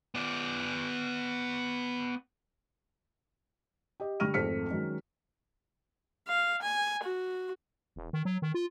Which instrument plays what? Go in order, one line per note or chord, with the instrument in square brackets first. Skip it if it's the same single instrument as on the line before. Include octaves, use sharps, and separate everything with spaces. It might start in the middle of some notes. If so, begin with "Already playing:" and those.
[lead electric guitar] B3 D5
[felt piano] G4 D#5
D3 G3 C#6 F6 A#6 D#7
G#1 F2 A3 F6 B6 C#7
D#3 F#3 G#3 C#4
[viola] F5
G#5
F#4
[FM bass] E1
D#3
F#3
D#3
F4